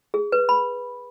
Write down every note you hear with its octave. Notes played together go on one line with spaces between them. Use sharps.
G#4
B4
B5